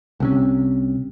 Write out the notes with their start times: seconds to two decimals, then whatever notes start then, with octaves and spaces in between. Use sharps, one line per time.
0.20 C2 C3 C#4